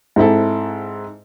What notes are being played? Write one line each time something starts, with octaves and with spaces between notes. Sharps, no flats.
G#2 C4 E4 A4